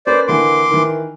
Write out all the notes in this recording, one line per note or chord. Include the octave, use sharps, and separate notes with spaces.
A#3 C#4 B4 C5 D5
D3 E3 A#3 C6 D6
D#3 E3